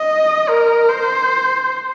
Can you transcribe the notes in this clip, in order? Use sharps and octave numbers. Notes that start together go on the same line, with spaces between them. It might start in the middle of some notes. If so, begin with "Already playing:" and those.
Already playing: D#5
A#4
C5